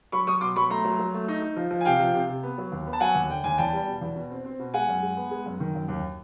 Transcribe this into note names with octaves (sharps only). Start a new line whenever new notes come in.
F#3 B5 C#6
F#3 C#6 D#6
B2 C6 D6
F#3 B5 C#6
A3 A#5 C6
F#3
F#3
A3
D#4
D#4
F3
F3
G#5
C3 F5 G5
F3
C3
C3
B3
F#3
D#2
B3
A5
F#3 F#5 G#5
D#2
D3 G5
D#2 G#5
E2 G5 A5
G3
B2
E2
B2
C4
C4
B2
G#3 F#5 G#5
F#2
G#3
B3
G#3
F#2
D#3
F#2
D#2